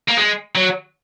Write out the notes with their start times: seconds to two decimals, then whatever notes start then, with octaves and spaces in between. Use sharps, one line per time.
0.08 A#3
0.18 G#3
0.55 F#3